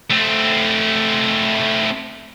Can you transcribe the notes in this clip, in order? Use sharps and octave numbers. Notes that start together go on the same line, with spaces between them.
A3 C4